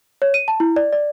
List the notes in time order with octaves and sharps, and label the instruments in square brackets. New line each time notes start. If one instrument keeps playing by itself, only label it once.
[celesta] C#5
D#7
A5
E4
D5
D5